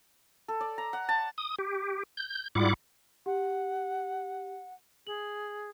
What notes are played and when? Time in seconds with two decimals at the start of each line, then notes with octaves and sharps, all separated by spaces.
0.48 A4
0.60 D5
0.78 A#5
0.93 F#5
1.09 A5
1.38 D#6
1.59 G4
2.17 G6
2.55 G#2 G3 E4 F4 F#5 D6
3.26 G4 F#5
5.07 G#4 F#7